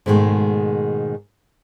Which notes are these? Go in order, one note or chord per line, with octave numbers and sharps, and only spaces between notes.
G#2 B2 D#3 E3 G#3 A3